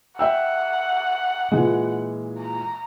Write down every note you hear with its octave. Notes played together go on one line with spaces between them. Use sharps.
E5 F#5 G5 E6
A#2 E3 G#3
A#5